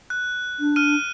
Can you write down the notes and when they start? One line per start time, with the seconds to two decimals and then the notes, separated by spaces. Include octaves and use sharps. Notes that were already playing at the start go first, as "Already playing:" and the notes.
0.10 F#6
0.60 D4
0.76 F6 D#7